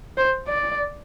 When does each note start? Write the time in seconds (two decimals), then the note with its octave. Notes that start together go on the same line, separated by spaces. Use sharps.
0.18 C5
0.48 D5